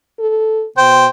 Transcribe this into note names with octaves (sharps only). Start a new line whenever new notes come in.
A4
B2 C5 G5